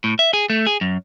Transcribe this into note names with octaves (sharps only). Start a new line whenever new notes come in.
A2
E5
G#4
A3
G#4
F#2